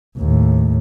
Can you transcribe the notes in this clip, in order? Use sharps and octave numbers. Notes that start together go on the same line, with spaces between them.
D#2 A2